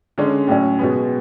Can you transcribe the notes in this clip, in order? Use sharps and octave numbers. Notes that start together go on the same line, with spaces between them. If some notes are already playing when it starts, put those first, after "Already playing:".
D3 G#3 C#4
A2 F#3 C#4
B2 G#3 B3